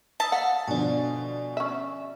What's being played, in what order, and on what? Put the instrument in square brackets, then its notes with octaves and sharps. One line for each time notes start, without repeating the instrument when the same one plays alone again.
[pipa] A5 [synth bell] D#6 E6 B6
[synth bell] F5 [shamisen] F#5
[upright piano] B2 D3 F3 [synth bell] D5 G#5
[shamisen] C#4 E5